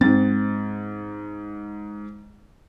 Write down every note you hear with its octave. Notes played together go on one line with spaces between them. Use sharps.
G#2 C4 A6